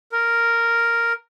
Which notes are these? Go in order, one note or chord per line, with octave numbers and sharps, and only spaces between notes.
A#4